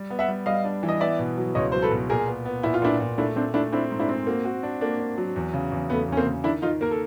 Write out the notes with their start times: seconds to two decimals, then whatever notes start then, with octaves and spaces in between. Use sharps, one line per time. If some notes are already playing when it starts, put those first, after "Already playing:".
Already playing: G3
0.10 B3
0.19 E5 F#5
0.28 G3
0.46 G3 D#5 F5
0.65 D4
0.83 E3
0.89 D#5
1.00 B3 D5 E5
1.19 B2
1.37 F#3
1.55 C#2 C#5 D#5
1.72 F#3 C5
1.82 A4 B4
1.91 B2
2.10 A#2 G#4 A#4
2.28 B3
2.45 B3
2.63 A#2 E4
2.74 F4
2.82 A#2 D4 E4
3.00 A#2
3.18 A3 D4 E4
3.36 A3 C4 D4
3.54 A3 D4 E4
3.72 C4 D4 E4
3.91 G#2
4.00 D4 E4
4.09 C4
4.27 A#3 F#4
4.45 F#4
4.63 D4
4.81 A#3 D4
4.99 D4
5.18 F#3
5.36 E2
5.54 C#3
5.72 E2
5.90 E2 A3 B3
6.08 E2 C#4
6.17 A#3 C4
6.26 C#3
6.44 D#3 D4 E4
6.62 D#3 D#4 F4
6.81 A#3 A#4
6.91 A4